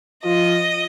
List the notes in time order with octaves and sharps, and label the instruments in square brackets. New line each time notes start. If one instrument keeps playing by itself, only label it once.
[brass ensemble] F3 F4 [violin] D#5